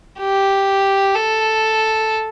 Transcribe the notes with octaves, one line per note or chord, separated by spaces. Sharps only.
G4
A4